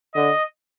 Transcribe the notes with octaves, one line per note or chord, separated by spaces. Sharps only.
D3 D#5